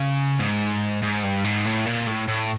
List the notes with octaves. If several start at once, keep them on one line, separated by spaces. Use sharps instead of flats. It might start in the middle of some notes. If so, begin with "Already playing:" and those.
Already playing: C#3
G#2
G#2
G2
G#2
A2
A#2
A2
A2